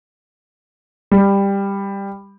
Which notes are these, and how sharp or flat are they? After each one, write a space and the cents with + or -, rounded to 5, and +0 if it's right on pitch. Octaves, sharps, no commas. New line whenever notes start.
G3 +15